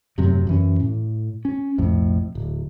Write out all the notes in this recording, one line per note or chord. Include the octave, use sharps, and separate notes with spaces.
F#2 A2 C3 F#3
F#2 E3 C#4
A2
C#4
B1 F2 A2
D1